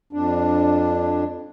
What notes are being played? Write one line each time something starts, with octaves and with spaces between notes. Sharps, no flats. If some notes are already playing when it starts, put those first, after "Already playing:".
F2 D4